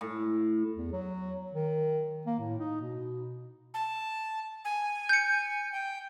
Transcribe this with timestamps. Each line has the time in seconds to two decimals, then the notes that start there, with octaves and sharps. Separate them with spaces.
0.01 A2
0.76 E2
0.92 F#3
1.52 D#3
2.26 A#3
2.39 A2
2.58 D#4
2.81 B2
3.74 A5
4.65 G#5
5.09 G6 C#7
5.72 G5